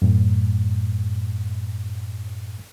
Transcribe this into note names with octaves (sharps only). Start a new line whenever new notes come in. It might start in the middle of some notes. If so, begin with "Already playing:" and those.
F#2 A2